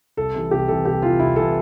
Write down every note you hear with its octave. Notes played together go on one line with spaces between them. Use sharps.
C2 A4
C3 E3
C2 G4
C3 E3 A4
C2 G4
C3 E3 F4
C2 E4
C3 E3 A4